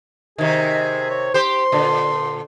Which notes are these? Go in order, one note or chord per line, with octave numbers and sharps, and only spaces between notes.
C3 D#3 G#4
C#5
G4 C5 C6
A#2 D3